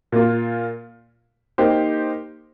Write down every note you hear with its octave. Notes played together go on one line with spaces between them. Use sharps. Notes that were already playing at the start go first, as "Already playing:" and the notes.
A#2 A#3 F4
A#3 D#4 G4 C5